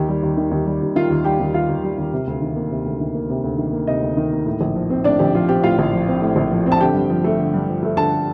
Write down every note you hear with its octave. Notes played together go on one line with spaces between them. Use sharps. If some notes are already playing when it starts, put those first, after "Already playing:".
Already playing: D#2 D#3 G4
G3
D#2
D#3
D#2
G3
D#2
D#3 F4 F5
D#2
G3 G4 G5
D#2
D#3 F4 F5
D#2
G3
D#2
C3
D2
D#3
A#3
C3
D2
D#3
A#3
C3
D2
D#3
A#3
C3 D#4 D#5
D2
D#3
A#3
A2
A#1
F3
C4
A2 D4 D5
A#1 G4
F3 F4
C4 G4
A2 F4 F5
A#1
F3
C4
A2
A#1
F3
C4
A5
D3 G4 G5
G2
F3
A3
D3
G2
F3
A3
D3 A4 A5